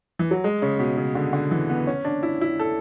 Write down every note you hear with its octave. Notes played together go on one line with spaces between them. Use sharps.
E3
F#3
G#3
C#3
B2
C#3
D3
D3
E3
B3
C#4
D4
E4
E4
A4